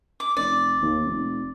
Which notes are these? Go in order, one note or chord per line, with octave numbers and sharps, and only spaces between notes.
D6
F1 D5
D#2
F1